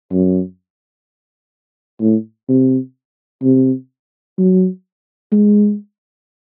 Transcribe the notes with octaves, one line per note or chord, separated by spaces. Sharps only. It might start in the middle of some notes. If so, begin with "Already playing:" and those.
F#2
A2
C3
C3
F#3
G#3